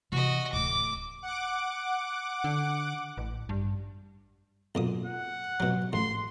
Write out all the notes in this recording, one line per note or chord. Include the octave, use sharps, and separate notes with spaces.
C3 E3 F#4 D#5
D1 A3 D6
F#5 D6
D3
A1
G2
B1 A#2 D#6
F#5
B2 F#3
A1 C6